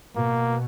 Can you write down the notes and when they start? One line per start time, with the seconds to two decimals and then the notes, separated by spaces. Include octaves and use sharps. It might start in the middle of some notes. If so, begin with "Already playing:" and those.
0.17 B2 A#3